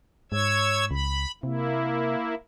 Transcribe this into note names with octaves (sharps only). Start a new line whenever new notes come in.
G#2 C#5 E6 G#6
C#2 B5
C3 A#3 E4